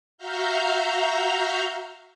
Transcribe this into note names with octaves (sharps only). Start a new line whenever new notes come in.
F#4 E5 F5 A#5 F6 G6